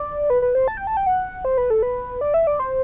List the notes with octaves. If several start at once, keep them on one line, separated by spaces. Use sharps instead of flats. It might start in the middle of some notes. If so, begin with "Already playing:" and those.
Already playing: D5
B4
B4
C5
A5
G5
A5
G5
F#5
C5
B4
A4
B4
D5
E5
D5
C5